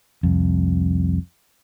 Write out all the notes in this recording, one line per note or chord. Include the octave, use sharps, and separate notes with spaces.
C2 F2